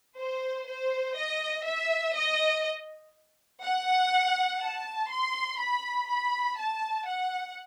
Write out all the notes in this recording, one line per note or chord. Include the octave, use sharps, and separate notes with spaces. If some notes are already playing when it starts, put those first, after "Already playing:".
C5
C5
D#5
E5
D#5
F#5
A5
C6
B5
B5
A5
F#5